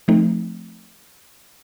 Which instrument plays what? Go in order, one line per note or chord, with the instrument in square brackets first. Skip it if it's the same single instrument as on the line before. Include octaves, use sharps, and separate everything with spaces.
[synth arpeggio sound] F3 A3 C4 D#4